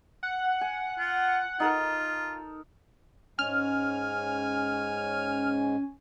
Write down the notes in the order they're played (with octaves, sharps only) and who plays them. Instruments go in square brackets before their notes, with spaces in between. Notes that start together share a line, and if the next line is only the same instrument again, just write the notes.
[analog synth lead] F#5
[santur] G#5
[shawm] F4
[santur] D#4 A4 A#4 [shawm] F4
[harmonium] G#2 G#3 [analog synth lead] C#4 [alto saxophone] G#5 [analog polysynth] F6